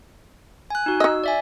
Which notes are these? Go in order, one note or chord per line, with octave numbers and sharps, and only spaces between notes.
G#5 F#6
D#4 F#4
D#4 D#5 E6
D5 E5 G#5